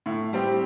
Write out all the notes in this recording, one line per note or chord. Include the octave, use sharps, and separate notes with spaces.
A2
G3 C4 G4